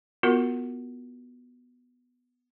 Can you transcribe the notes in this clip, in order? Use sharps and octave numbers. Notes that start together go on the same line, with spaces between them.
B3 F4 F#4 A#4